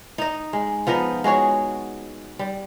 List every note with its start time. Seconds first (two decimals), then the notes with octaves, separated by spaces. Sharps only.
0.18 D#4 D#5
0.53 G#3
0.87 F3 B3 D#4 D#5
1.24 G#3 F#4 G#4 C#5
2.39 G3